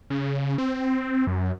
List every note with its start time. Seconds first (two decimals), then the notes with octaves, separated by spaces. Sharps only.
0.10 C#3
0.58 C4
1.27 F#2